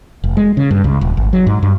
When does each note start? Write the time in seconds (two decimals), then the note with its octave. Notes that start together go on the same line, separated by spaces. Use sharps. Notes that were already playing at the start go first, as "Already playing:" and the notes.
0.24 F1
0.37 G#3
0.57 C#3
0.71 G2
0.84 C#2
1.01 D#1
1.17 G#1
1.33 F#3
1.47 G#2
1.63 G2